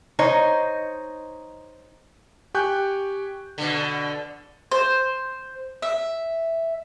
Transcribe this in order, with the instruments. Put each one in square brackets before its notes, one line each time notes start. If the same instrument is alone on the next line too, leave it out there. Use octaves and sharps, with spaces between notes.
[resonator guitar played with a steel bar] D#4 C5 C#5 D#5
[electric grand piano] G4 G5 G#5 C#6 F#6 G6
[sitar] B2 D3
[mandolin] C5
E5